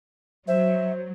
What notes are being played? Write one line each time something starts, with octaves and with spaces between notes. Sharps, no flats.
F#3 C5 E5